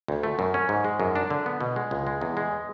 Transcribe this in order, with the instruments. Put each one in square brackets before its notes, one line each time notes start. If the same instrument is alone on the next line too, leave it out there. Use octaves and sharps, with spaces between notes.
[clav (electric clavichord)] D2
A3
F#2
C#4
G#2
G#3
F#2
D4
D3
B3
B2
G#3
C#2
G#3
E2
G#3